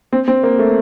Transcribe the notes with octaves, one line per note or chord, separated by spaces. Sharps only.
C4
C4
A#3
A3